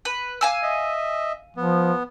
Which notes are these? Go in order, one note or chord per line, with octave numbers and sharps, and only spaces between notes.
B4
F5 G#5 E6
D#5 E5
F3 B3